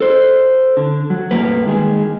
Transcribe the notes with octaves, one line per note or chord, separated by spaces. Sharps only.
A4 C5
D3
F#3
G2 B2 A3 A#3 B4
D#3 G#3 G#4